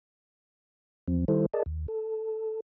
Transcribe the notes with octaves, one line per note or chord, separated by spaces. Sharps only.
E2 F3 C4
D#3 G3 E4 A4 C5
G#4 A#4 D5 D#5 A5
D#2
A4